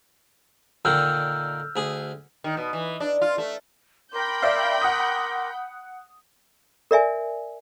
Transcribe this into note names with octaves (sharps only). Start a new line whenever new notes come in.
A#2 D3 D#3 E6 F6 G6
D2 G#4
D#3
B2
E3
D4
F4
A3
A#4 G5 B5 C6 D6 G6
D5 E5 F5
F#5 D#6
A#4 D5 E5 G#5